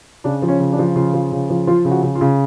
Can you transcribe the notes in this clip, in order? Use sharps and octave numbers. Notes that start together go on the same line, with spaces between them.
C#3 D4
F3
C#4
C#3
D4
F3
C#3 F4
F3
C#3
F3
F3 F4
C#3
F#4
C#3
F4
C#3